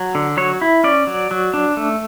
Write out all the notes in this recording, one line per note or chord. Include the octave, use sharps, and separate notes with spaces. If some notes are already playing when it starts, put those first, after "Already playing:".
Already playing: F#3
D3
F#3 C#5
E4
C#4 D5
F#3
F#3
D4
A3